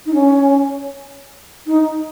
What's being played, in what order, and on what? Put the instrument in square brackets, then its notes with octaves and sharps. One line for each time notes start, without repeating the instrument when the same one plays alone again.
[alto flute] D#4
C#4
D#4